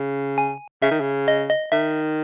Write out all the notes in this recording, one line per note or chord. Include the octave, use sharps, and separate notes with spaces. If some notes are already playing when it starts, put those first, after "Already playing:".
Already playing: C#3
G#5
C#3 E5
D#3
C#3
D#5
D#5
D#3 E5